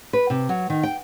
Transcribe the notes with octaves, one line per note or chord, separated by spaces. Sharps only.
B4
C3
F#3
D#3
G5